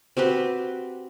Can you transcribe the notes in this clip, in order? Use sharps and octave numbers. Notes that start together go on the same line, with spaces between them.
C4 F#4 G4 B4